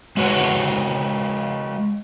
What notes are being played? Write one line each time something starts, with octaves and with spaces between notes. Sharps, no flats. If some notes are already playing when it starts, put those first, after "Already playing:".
G#3 F#4 B4 C#5 F#5